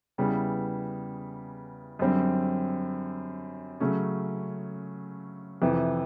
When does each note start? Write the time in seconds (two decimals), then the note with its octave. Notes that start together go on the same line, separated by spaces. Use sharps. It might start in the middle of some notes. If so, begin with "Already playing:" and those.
0.18 E2 C#3 E3 G3 B3
1.99 F#2 D3 G3 C4
3.80 C#3 F#3 A3 C#4
5.62 F2 C3 E3